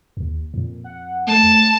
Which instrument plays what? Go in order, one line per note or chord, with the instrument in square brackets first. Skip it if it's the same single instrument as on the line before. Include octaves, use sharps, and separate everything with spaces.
[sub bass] D#2
[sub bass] F2 [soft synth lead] A#2
[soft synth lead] F#5
[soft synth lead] A3 [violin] A5